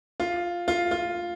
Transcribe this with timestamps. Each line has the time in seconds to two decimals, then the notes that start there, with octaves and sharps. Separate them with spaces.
0.20 F4
0.68 F4
0.91 F4